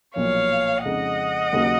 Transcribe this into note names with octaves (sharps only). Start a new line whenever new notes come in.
B1 A#2 F3 A#3 C#5 F5
F2 C#3 G#3 D#4 D#5 F#5
D#2 C#3 F#3 A#3